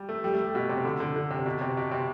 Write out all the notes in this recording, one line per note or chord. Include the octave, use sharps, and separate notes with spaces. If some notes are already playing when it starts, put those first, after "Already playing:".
Already playing: G3
A3
G3
A3
G3
B2
C3
D3
D3
D3
C3
B2
C3
B2
C3